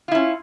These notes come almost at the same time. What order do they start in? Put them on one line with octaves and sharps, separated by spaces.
F4 E4 C#4